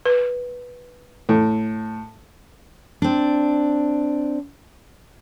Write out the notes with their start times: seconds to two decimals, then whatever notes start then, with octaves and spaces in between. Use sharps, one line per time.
0.06 B4
1.29 A2
3.02 C4 D4